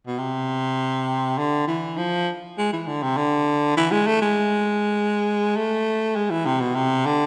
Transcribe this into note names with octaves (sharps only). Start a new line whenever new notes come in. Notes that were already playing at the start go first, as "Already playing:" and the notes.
B2
C3
D3
E3
F3
G#3
E3
D3
C3
D3
E3
G#3
A3
G#3
A3
G#3
E3
C3
B2
C3
D3